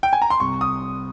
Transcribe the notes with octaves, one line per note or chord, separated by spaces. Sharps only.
G5
G#5
A#5
C6
C2 C#6
D#6